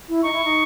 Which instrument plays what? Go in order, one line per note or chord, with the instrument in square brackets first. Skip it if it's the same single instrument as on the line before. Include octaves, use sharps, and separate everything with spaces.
[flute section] E4
[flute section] D#4 [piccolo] C#6
[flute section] E4
D#4